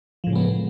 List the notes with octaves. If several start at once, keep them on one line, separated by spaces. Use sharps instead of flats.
A2 C#3 F3 G#3 B3